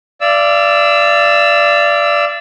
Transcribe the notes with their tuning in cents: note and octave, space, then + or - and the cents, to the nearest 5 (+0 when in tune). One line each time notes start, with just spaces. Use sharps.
D5 +0 F5 -40 E6 -5